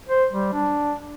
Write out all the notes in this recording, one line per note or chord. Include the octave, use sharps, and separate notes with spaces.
C5
G3
D4